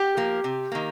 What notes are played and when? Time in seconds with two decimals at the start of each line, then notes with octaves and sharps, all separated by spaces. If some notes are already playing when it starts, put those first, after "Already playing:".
Already playing: G4
0.17 F3 A#3
0.44 C3
0.72 D#3 A#3